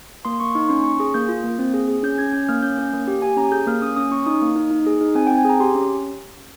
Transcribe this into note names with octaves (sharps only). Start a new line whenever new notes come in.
A#3 C6
A#3 C#6
D#4 C#6
C#4 C6
C#4 C#6
G#4
A#3 G6
F4
A#3
C4
G#4
G#4
C#4 G6
C#4 G#6
C#4 G6
A#3 F6
C#4 G6
C#4 G6
A#3
G4
G4 G#5
C#4 A#5
G#4 G6
A#3 F6
C#4 D#6
C#4 D#6
C#4 C#6
D#4 D#6
A#3
D#4
D#4
G#4
D#4
C4 G#5
G5
C4
G#5
G#4 A#5
G4 C6
C#4